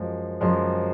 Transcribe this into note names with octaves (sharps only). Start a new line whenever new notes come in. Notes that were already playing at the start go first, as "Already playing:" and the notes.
Already playing: F#2 F3 G#3
F#2 F3 G#3 C6